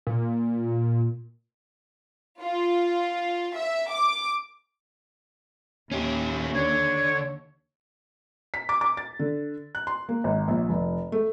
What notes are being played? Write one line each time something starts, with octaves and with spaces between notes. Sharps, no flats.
A#2
F4
E5
D6
D#2 C#4 G4
D3 C#5
B6
D6
D6
A6
D3
F#6
C6
A#3
G#1
A#1
F1
A3